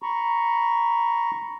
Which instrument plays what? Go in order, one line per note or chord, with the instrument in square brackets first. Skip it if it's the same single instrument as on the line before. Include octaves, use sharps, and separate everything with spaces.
[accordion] A#5 B5 C#6